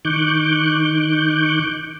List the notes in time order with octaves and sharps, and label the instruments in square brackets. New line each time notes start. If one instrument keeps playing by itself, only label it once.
[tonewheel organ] D#3 C#6 D6 F#6 G6